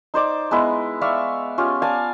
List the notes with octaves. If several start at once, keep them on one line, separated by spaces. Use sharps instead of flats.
D#4 C5 D5 D6
G#3 B3 D#4 E4
D5 E5 F5 C#6
C#4 F4 G4
D5 F5 G#5 A5